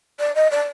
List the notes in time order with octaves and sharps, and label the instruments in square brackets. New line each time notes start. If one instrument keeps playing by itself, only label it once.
[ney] D5
D#5
D5